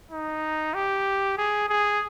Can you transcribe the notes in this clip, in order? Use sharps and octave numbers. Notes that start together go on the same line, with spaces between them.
D#4
G4
G#4
G#4